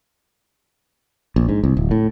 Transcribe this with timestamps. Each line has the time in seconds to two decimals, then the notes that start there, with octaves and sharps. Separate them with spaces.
1.36 A#1
1.49 G#2
1.64 C2
1.77 D1
1.91 A2